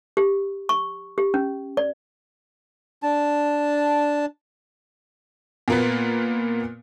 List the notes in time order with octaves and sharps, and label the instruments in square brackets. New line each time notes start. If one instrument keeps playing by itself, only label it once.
[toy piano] G4
C#6
G4
C#4
D5
[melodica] D4 A5
[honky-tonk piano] A#2 A#3 B3